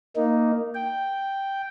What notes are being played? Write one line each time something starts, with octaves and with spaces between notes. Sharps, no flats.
A#3 D#4
G5